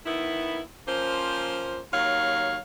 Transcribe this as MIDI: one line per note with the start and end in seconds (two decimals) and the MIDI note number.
0.06 0.60 51
0.06 0.60 59
0.06 0.60 64
0.87 1.80 53
0.87 1.80 58
0.87 1.80 61
0.87 1.80 72
1.93 2.57 39
1.93 2.57 54
1.93 2.57 73
1.93 2.57 77